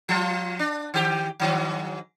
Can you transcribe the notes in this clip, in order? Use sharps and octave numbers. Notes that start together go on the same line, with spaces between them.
F3 F4
D4
D#3 G4
G#2 D#3 F#3